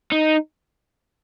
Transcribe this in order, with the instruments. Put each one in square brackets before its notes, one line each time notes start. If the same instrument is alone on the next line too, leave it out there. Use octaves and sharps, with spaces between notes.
[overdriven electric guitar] D#4